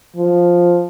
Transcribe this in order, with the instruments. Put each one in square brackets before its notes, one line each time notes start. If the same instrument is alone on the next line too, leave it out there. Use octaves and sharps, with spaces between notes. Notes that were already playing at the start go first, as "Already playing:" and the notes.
[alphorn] F3